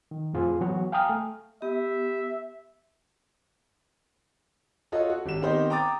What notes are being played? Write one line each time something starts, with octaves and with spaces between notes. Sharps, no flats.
D#3
F2 A2 F4 G#4 C5
E3 F#3 B3 F#4 C#5
F5 G5 G#5 A#5 D#6 F6
A3
B3 G4 E5
F4 F#4 A4 C#5 D#5
F#4
G#1 G4 E7
D#3 B3 C4 D#4 G4 C5
G5 A#5 D6 D#6 A6